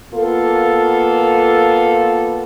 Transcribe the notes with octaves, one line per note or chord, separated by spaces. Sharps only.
A#3 B3 F4 A4